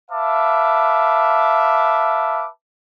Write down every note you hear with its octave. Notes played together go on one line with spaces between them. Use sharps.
B4 E5 F5 A5 D6